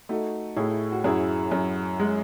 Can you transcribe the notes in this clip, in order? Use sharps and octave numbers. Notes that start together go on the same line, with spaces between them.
A3 D#4 F#4
A2 E4 G#4
F#4
F#2 E4 G#4
F#2
G#3